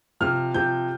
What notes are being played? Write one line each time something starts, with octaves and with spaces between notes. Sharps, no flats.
C3 F3 F6
C3 F3 G6